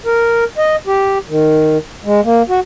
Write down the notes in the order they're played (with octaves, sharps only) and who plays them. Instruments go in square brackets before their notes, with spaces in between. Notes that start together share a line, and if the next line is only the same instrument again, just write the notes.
[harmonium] A#4
D#5
G4
D#3
G#3
A#3
F#4